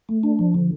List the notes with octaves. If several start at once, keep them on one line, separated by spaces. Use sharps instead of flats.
A3
D4
F3
D3